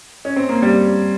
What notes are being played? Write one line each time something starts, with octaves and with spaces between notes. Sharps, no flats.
C#4
C4
A#3
G3